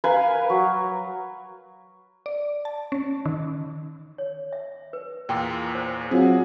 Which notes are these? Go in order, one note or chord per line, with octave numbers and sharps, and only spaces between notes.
A#4 B4 F5 G#5
F#3
D5
A5
C#4
D#3
C#5
E5
B4
E2 A#2 G#4 G5 C6
C5
F#3 C4 F4 G#4